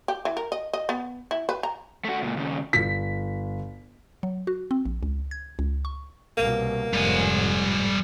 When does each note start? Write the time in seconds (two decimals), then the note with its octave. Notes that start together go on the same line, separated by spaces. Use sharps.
0.08 G4
0.25 E3
0.37 A#4
0.52 D#5
0.73 D#5
0.89 B3
1.31 E4
1.49 B4
1.63 A#5
2.05 A3 F#4
2.22 C#2 A#2
2.37 D#2 C#3
2.73 G1 B6
4.23 F#3
4.47 F#4
4.71 C4
4.85 A#1
5.03 C#2
5.31 G#6
5.59 C#2
5.85 C#6
6.37 C2 B2 A#3
6.93 F1 G#2 G3 G#5